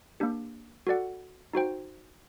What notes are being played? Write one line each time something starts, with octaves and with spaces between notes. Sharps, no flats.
A#3 D4 G4
F#4 A4 D5 F#5
D#4 F#4 C5 G5